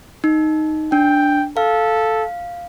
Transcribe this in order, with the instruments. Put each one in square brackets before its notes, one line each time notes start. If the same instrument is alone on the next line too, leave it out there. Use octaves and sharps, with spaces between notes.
[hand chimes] D#4
[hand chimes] D4 [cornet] G5
[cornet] A4 [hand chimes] F5